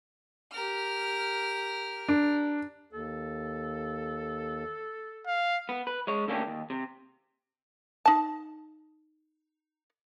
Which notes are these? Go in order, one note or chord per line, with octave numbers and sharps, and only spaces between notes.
G4 A#4 F6
D4
D#2 A4
F5
B3
B4
G#3 C#5
D3 A3 A#3 C#4 D4 G4
D#2
C3
D#4 A5